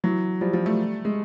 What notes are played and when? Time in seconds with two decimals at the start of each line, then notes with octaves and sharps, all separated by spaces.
0.04 E3 F#3
0.41 F3 G3
0.53 F3 G3
0.66 G3 A3
1.05 G#3